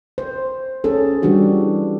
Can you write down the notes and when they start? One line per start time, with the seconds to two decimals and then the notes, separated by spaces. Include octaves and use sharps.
0.18 C5
0.84 C#4 G#4 A4
1.22 E3 G3 D4 F#4 G4